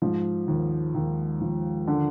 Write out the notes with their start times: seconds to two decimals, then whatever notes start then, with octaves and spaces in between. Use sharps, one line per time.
0.02 G#2 F3
0.48 D#2
0.95 D#2
1.41 F3
1.87 D3